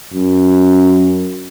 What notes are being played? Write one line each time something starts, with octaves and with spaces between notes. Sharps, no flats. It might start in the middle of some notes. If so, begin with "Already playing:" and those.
F#2